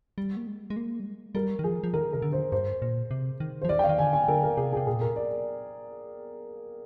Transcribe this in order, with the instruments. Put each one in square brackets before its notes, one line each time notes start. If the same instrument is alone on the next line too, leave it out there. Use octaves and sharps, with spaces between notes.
[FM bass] G3
A#3
G#3
G#3
A#3
G3
G#3
[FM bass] G3 [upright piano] A#4
[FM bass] D#3
[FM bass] F3 [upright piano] G#4
[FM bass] F3
[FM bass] D#3 [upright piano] A#4
[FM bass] C3 [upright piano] A#4
[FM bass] D3
[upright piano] C5
[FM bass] G2 [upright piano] C5
[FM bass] A#2
C3
D#3
[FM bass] F3 [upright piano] C5
[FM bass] D#3 [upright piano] D5
[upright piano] G5
F5
[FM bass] D#3
[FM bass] D3 [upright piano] G#5
[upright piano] G#5
[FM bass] D3 [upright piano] A#4
[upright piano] A#4
[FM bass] C3 [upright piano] G#4
[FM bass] C3 [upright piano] G#4
[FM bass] A#2 [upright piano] G#4
[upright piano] A#4
D5